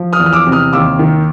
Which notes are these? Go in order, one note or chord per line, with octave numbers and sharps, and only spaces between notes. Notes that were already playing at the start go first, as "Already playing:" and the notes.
Already playing: F3
D#6 F6
E2
F6
D6 E6
C3
D#6 F6
D#2 D6 E6
D#3